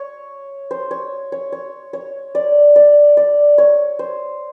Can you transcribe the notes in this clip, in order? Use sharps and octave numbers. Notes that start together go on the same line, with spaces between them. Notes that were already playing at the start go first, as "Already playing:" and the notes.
Already playing: C#5
C5
C#5
C#5
C#5
C#5
D5
D5
D5
C#5
C5